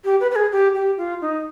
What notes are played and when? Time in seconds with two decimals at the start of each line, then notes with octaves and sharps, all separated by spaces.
0.05 G4
0.20 B4
0.31 B4
0.36 G#4
0.52 G4
0.75 G4
0.98 F4
1.21 D#4